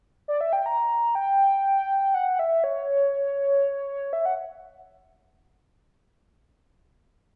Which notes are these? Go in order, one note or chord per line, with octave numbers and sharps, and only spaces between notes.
D5
E5
G5
A#5
G5
F#5
E5
C#5
E5
F#5